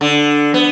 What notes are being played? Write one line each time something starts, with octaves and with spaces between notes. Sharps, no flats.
D3
B3